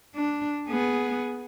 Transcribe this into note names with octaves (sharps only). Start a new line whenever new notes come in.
D4
B3 G#4